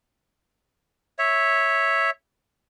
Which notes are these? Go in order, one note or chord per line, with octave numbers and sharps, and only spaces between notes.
C#5 E5